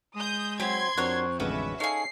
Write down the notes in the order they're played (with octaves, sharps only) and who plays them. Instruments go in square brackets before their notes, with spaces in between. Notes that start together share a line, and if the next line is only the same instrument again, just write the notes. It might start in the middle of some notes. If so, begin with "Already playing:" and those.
[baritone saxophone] G#3 [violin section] D#6 G6
[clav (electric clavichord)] F#3 F#4 [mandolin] C4 B5 [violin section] C6 G#6
[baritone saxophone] F2 [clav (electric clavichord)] D4 F#4 A#4 [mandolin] C5 C#5 F#6
[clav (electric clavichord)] A1 D3 G#3 [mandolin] C#4 F#4 B4 [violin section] E5
[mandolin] C#4 G#4 [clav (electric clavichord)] D#4 A4 F5 [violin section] C7